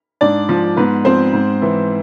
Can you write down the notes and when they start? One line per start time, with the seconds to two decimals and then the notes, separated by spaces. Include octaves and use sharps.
0.21 G#2 D4 D5
0.49 F3
0.76 G#2 B3 B4
1.05 F3 C4 C5
1.33 G#2
1.62 E3